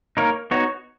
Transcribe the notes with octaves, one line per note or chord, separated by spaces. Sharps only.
A#3 D#4 A#4 C#5
B3 D#4 F#4 C#5